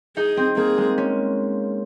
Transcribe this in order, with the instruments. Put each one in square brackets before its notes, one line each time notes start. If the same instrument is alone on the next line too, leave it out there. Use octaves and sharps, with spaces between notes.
[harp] D#4 [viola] G#4
[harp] C4
[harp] A#3 [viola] G#4
[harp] G#3
C#4